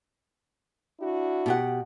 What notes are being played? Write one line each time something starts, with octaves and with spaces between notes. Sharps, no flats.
D4 E4 F#4
B2 G4 F#5